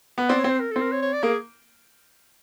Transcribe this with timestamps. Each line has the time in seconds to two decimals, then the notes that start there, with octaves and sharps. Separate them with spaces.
0.18 B3
0.29 C4 D5
0.39 C#5
0.44 C4
0.50 C5
0.60 A#4
0.71 A4
0.76 C4 A#4
0.92 C#5
1.02 C#5
1.13 D5
1.23 A#3 G#4